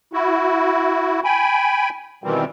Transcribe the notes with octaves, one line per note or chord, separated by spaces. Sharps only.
E4 F#4
G5 G#5 B5
B2 D#3 E3 G3 C4